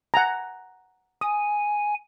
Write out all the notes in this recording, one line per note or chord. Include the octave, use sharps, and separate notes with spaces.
F#5 G#5 A#5
G#5 D#6